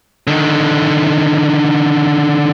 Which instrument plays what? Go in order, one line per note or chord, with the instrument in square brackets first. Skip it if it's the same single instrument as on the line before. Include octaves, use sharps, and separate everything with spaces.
[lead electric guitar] D3 D#3